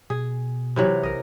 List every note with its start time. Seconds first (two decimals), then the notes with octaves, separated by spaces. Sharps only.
0.10 B2 G#4
0.76 C3 E3 F#3
1.03 B1 A#4 D#5